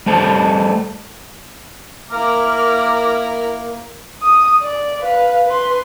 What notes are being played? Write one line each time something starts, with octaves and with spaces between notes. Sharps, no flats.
G3 A3 C5 A5
A#3 E4 A#4 A#5 D6 F6
D#6
D5
B4 F5
B4 C6